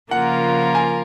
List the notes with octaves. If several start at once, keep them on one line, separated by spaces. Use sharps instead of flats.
C#3 F3 A#3 F4 A#4 F#5
G#5